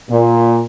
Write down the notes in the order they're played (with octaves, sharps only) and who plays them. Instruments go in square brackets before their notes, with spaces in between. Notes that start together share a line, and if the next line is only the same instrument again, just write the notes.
[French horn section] A#2